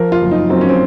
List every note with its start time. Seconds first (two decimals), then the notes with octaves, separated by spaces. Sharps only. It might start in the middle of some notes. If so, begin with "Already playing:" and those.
Already playing: F3 A#4
0.12 F4
0.22 F#1
0.31 D#4
0.49 F#2 C4
0.61 C#4
0.69 C4